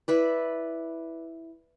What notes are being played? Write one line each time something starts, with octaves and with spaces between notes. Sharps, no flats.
E4 B4 D5